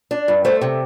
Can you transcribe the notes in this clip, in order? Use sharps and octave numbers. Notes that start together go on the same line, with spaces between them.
D4
G2
A3 C5
C3